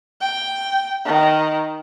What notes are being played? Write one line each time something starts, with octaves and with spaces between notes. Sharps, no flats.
G5
D#3